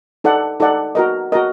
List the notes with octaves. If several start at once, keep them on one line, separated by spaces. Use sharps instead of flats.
D#4 A4 D5 F#5
D#4 A4 D5 F#5
F#4 A#4 D#5
F#4 A#4 D#5